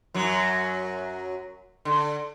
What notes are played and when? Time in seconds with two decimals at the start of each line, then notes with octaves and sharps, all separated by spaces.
0.14 F#2 F#3
1.85 D3